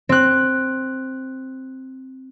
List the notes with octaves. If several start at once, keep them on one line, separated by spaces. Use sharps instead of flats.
C4 F#6